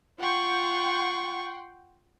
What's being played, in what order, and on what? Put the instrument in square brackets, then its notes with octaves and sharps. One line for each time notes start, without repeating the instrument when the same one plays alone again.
[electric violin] F4 C#6 [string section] F#5 G5 C6